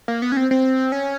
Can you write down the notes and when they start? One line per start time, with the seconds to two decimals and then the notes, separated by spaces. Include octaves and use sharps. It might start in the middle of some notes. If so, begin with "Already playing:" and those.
0.08 A#3
0.22 B3
0.32 C#4
0.37 C4
0.51 C4
0.92 C#4